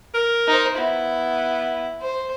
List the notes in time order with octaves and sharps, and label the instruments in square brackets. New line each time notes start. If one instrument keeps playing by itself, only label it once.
[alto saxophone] A#4
[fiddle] D#4 C5
[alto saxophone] B3 [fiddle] E4
[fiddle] C5